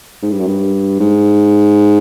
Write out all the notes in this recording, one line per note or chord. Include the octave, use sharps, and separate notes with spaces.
G#2
G2
F#2
G2
G#2